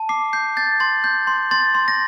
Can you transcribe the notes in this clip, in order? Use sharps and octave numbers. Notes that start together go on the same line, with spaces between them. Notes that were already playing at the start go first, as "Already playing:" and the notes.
Already playing: A5
D6 C7
G6 C7
G6 A6
C6 A6
G6
C6
C6 A6
C6
A#6